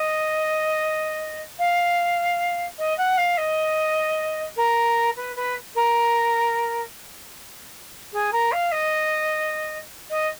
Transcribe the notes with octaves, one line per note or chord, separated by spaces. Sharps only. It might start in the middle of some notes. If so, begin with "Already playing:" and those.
Already playing: D#5
F5
D#5
F#5
F5
D#5
A#4
B4
B4
A#4
G#4
A#4
F5
D#5
D#5